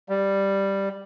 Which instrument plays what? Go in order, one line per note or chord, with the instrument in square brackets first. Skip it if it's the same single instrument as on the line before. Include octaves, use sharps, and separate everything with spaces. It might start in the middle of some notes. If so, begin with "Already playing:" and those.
[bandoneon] G3